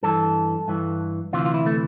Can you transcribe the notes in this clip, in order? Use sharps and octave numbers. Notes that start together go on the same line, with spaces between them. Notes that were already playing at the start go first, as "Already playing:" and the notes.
G2 E3 A4
G2 E3
D2 C3 E3 F4
F4
E4
A3